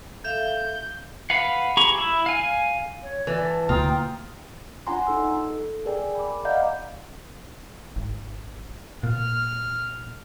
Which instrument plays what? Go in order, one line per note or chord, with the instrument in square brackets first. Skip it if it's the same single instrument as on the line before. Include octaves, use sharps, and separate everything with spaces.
[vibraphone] A4 E5 F5 [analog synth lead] G6
[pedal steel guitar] B4 F5 F#5
G4 G#4 A#5 B5 C#6
E4
F5 G#5
[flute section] C#5
[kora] E3 [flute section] D5
[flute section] A5
[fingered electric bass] D2 B2 A#3 [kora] F4 [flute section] G5 A#5 D#6
[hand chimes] D4 F4 F#5 G#5 A#5 C6
D#4 A4 E6
A4
G#4 A#4 D5 G5 G#5
B5 D6
D5 D#5 F5 F#5 A#5 G6
[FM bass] G#1
[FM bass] A#2 [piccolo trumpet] F6